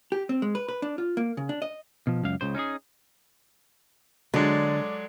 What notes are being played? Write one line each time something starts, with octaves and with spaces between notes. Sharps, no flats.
G4
C4
G#3
B4
B4
D4
F4
A#3
C#3
D4
D#5
B2 F3
C#2 F#2 F5
C#2 C#3 C5
C#4 D#4 E4 G#4
D3 F#3 G#3 D5